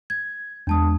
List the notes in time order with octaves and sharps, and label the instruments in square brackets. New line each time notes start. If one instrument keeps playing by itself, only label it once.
[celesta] G#6
[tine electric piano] E2 G#3 [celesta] D4 A5 D#6